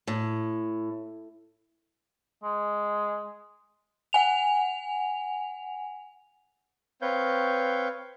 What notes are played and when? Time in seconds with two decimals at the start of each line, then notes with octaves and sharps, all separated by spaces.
0.07 A2
2.44 G#3
4.13 F#5 G#5 F7
7.02 C4 B4 C#5 F5 G6